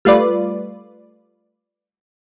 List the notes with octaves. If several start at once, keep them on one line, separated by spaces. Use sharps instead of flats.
G3 A3 F4 B4 D5